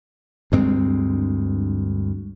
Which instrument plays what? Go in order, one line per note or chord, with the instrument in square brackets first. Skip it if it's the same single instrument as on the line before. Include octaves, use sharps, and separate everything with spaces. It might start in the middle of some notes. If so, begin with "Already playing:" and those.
[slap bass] D2 G2 G#3 C4